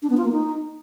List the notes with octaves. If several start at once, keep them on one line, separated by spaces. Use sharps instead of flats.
D4
B3
F4
A#3
D#4